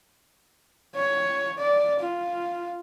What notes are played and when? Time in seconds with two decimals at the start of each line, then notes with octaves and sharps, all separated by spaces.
0.96 C#5
1.59 D5
2.00 F4